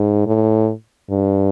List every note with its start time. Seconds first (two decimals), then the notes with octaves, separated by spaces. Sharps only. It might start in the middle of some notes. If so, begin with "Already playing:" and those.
Already playing: G#2
0.26 A2
1.11 G2